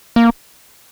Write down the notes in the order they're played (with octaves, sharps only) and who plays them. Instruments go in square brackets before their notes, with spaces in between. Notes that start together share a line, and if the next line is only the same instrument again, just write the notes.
[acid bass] A#3